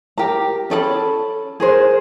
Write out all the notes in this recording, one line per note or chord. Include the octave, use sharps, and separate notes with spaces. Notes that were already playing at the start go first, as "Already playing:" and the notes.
G4 A#4 A#5
C#4 A4 D5 B5
G#4 A#4 C5